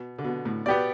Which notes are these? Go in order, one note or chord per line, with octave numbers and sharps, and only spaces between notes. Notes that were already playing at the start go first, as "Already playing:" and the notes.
Already playing: B2
D3
B2
A2
B2 B3 G4 D5